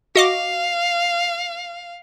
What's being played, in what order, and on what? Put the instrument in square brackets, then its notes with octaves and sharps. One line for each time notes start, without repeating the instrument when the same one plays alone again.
[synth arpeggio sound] F#4 D#5 D6 [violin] F5